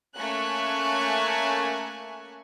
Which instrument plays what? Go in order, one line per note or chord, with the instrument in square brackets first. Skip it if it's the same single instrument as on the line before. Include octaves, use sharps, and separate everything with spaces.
[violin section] A3 A#3 C#4 G#5 C#6 F#6